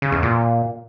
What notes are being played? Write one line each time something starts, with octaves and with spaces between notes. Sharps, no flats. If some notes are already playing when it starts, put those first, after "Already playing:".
C#3
E2
A#2